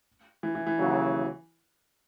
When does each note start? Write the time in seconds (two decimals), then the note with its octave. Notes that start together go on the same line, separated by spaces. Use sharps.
0.43 E3
0.55 E3
0.67 E3
0.79 D#2 C#3 F#3